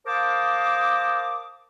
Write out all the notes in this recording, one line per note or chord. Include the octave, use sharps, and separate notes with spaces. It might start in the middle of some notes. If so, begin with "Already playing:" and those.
A#4 C5 F5 A5 D6 D#6